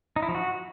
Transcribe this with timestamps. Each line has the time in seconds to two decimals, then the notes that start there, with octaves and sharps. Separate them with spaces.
0.16 D#4
0.22 E4
0.29 F3
0.35 F#4